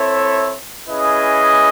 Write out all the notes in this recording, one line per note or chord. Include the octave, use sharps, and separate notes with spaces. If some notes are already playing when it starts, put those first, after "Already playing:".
Already playing: C4 E4 A4 C#5 E5
C#4 E4 G#4 B4 D#5